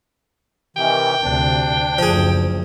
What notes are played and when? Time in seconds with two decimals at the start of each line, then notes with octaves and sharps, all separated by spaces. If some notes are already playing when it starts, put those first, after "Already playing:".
0.76 C3 D#3 E3 G5
1.22 D2 C3 D4
1.98 F#1 D2 F3 G#4